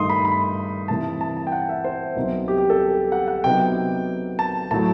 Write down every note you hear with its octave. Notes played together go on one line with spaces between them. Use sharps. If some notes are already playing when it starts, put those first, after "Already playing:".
Already playing: G2 D#3 A3 D#4 C6 D#6
B5
B5
C3 E3 G3 A5
A5
A5
G5
F#5
E5
C5
C2 C3 F#3 B3 D#4
G4
G4
A4
F#5
F#5
C3 F#3 B3 D#4 G5
A5
A2 F#3 A3 A5